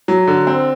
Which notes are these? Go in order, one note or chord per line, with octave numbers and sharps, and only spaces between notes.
F#3
D3
C4